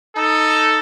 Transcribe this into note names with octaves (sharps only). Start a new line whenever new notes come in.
D#4 A4